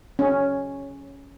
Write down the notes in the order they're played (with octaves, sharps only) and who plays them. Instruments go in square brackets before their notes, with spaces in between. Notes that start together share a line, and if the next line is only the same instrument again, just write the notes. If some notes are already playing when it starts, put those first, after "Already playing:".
[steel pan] C#4